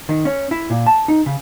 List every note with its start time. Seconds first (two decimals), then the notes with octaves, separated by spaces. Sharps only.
0.09 D#3
0.25 C#4
0.51 E4
0.70 A#2
0.86 A5
1.08 D#4
1.26 C#3